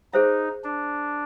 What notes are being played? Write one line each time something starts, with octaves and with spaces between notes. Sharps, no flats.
D#4 G#4 C5 E5
D4